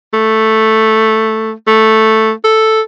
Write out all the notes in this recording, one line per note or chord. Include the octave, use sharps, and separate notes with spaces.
A3
A3
A4